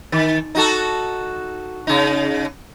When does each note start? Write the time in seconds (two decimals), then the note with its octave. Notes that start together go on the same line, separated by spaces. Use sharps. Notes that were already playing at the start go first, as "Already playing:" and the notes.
0.12 D#3
0.55 D#4 F#4 A4
1.87 C#3 D#4